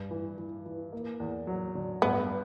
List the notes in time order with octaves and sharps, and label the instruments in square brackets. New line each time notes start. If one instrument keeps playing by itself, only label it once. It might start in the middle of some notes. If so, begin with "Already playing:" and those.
Already playing: [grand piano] G2
E3
E3
E3
A#3
E2
F#3
D3
[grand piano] G2 [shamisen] B3